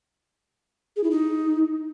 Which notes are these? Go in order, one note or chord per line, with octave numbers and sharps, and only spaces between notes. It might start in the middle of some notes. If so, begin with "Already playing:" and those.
G#4
E4
D#4